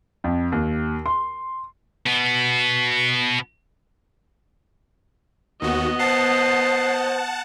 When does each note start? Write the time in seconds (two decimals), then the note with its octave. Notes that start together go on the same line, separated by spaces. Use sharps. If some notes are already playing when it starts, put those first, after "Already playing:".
0.24 F2
0.52 D#2
1.06 C6
2.06 B2 B3
5.62 D#2 B3 F#4 D#5
5.99 C5 F#5 A5 C7